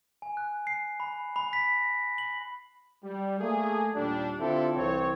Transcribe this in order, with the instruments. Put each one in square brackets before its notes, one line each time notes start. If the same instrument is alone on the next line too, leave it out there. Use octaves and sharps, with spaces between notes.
[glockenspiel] G#5
F#6
C7
B5
B5
B6
A#6
F#7
[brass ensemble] G3
A3 A#3 G#4
D#2 A#2 G3 D4
D3 C4 E4 F4 G4 A4
C2 E3 C4 C#5